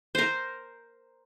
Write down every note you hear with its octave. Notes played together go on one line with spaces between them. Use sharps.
A#4 C5